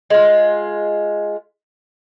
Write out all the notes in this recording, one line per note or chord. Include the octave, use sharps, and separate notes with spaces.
G#3 F4